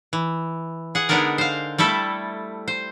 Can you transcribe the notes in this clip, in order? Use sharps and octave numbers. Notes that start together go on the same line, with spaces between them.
E3
G#4 F#5
D3 G#3 B3 D#4 A#4 D5
C5 F5
G3 A3 E4 A4
C5